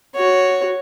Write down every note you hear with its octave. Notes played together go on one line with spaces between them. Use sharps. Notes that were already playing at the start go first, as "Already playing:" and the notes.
F#4 C#5